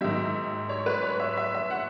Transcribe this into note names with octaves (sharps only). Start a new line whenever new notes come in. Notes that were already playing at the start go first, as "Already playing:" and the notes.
G#2 D#3 F#3 E5
C#5
B4
C#5
E5
E5
E5
F#5